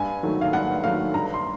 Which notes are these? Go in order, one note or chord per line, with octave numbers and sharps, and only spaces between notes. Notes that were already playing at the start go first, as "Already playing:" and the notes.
Already playing: G2 G#5
D#3 F#3 A3
F5
G2 F#5
D#3 F#3 A3 F5
G2 A#5
C6